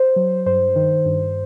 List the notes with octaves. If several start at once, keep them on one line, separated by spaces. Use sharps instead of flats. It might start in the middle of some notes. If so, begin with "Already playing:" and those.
Already playing: C5
F#3
G2 C5
D#3
G2